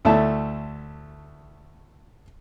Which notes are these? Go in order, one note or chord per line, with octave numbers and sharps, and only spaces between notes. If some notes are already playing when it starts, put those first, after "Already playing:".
D2 A3 E4 E5 A5